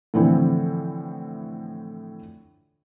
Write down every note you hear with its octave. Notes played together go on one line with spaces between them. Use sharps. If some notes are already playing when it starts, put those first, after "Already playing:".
A2 D3 E3 F3 C4